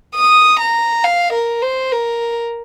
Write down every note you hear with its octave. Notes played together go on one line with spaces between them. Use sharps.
D#6
A#5
F5
A#4
C5
A#4